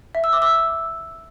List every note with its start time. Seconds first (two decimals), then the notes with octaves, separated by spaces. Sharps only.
0.15 E5
0.24 E6
0.33 D6
0.42 E6